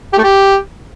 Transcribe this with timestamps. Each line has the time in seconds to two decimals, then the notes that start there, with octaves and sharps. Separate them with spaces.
0.13 G4
0.18 A3
0.24 G4